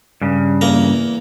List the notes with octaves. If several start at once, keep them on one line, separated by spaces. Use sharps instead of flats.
G2 C#3
E2 A#3 A#5